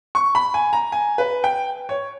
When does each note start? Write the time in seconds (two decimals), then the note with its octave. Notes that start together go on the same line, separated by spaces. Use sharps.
0.15 C#6
0.35 B5
0.54 G#5
0.73 A#5
0.92 G#5
1.18 B4
1.44 G5
1.89 C#5